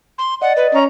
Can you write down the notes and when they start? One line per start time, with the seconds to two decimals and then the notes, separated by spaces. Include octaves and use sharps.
0.18 C6
0.42 D5 D#5 F#5
0.57 B4
0.74 C#4 A#5